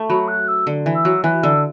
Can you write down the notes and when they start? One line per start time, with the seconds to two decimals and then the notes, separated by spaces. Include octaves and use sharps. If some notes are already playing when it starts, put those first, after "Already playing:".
Already playing: A3
0.09 F#3 B5
0.28 F#6
0.48 E6
0.67 D3
0.86 E3
0.95 E6
1.05 F#3
1.23 E3 F#6
1.43 D3 E6